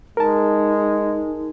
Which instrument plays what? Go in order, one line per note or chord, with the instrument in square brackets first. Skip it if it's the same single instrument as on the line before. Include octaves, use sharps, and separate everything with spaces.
[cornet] G#3 [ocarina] D#4 [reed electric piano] A#4 A5